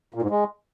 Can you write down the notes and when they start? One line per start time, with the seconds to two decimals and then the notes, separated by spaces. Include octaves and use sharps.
0.14 A#2
0.22 G#2
0.30 G#3